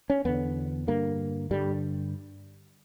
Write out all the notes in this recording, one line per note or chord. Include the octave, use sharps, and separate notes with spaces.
C#4
E2 D3 B3
G2 D3 A#3
G2 D3 G3